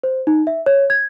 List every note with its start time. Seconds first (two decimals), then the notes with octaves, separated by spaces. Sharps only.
0.04 C5
0.27 D#4
0.47 E5
0.66 C#5
0.90 G#6